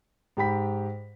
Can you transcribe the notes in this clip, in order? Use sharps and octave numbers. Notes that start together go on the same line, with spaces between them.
G#2 G4 G5 B5 B6